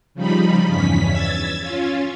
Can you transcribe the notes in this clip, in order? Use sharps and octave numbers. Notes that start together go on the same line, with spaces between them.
C#3 F3 G3 D#4 B5
E2 G2 C#4 B6
E6 G#6 A6
C#4 F4